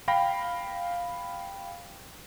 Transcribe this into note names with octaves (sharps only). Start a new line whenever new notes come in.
F5 G5 B5 A#6